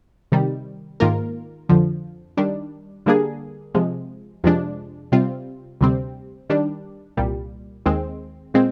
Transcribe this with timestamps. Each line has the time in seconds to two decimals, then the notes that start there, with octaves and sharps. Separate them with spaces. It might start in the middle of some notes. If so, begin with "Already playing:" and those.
0.32 C3 D#3 G3
1.00 G#2 D#3 A#3 F4 A#4
1.69 F2 D3 F3
2.37 D#3 G3 D4
3.06 D3 G3 A#3 D4 G#4
3.75 C3 F3 G#3
4.44 F2 C3 F3 G#3 D4
5.12 C3 G3 C4 F4
5.81 D2 C3 G3 C4
6.49 D#3 G3 D4
7.17 C2 A#2 G3
7.86 D#2 D#3 G#3 C4
8.54 A#2 G#3 C4